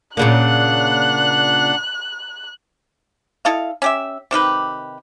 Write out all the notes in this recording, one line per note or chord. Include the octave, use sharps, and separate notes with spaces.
A#2 C#3 A#3 D4 F#5 F#6
E4 A4 D#5 F5
C#4 G4 E5
C3 D#3 G4 B4